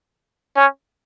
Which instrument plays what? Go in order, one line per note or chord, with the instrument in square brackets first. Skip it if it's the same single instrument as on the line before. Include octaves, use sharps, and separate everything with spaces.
[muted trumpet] C#4